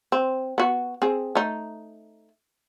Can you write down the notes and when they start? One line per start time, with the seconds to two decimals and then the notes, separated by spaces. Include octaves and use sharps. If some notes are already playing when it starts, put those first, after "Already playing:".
0.12 C4
0.58 B3 F#4
1.02 C4 G#4
1.35 A3 D#4